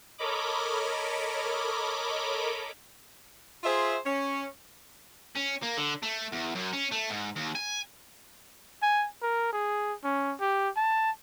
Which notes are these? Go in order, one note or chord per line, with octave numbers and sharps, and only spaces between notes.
A4 A#4 C#5 D#5 B5 D6
F4 G#4 C5 E5
C#4
C#4
A#3
D3
A3
E2
F#2
C#4
A3
G#2
D#2
G#5
G#5
A#4
G#4
C#4
G4
A5